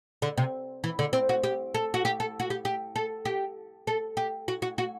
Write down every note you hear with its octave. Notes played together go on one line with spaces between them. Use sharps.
D3
C3
E3
D3
C4
F#4
G4
A4
F#4
G4
A4
F#4
G4
G4
A4
G4
A4
G4
F#4
F#4
F#4